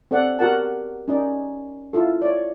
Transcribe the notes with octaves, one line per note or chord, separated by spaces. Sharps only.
C4 A4 D5 F#5
F#4 G4 A#4 F#5 A5
C#4 D#4 D5
E4 F4 A4
C#5 D5